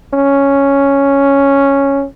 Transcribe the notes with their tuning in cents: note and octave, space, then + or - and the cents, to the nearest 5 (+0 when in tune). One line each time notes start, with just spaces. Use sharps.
C#4 +0